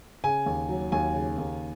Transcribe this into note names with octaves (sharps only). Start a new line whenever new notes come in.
C#3 G#5
D#2
F#3
D#2 G#5
C#3
D#2